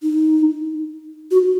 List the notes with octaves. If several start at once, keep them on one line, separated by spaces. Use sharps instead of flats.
D#4
F#4